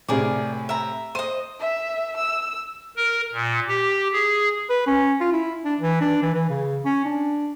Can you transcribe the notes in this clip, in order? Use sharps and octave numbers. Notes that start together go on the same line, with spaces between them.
A2 C3 G#4 A#4 D5
E5 A#5
C5 D#5 D#7
E5
E6
A#4
A#2
G4
G#4
B4
C#4
F4
E4
D4
E3
D4
E3
E3
C#3
C#4
D4